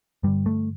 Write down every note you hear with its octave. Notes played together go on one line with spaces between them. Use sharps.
G2 D3 G3
A3